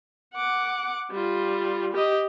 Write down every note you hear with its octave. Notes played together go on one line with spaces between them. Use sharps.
F#5 D6
G3 F4
G4 D#5